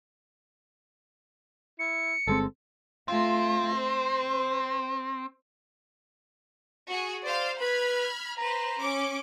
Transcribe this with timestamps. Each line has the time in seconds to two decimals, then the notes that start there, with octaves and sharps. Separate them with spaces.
1.79 E4 C#7
2.27 G1 G#3 C4 A4
3.08 A3 C4 F4
3.76 C5
6.88 F#4 G#4
7.24 C5 D5 F5
7.61 B4 B5 F6 G#6
8.37 B4 C5 A#5
8.79 C#4 D6